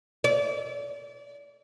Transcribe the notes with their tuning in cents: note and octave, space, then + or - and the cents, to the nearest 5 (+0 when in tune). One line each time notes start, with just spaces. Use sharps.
D5 -40